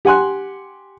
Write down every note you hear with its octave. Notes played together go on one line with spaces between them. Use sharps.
G4 F#5 G#5 C6 F#6